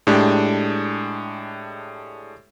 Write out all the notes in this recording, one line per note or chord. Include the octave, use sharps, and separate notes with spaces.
A2 G#3 D4 G4